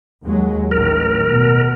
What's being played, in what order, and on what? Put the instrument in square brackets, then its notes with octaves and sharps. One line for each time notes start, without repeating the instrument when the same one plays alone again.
[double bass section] D#2 F#3 G#3
[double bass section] A1 A2 D#3 [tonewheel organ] A#4
[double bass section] B2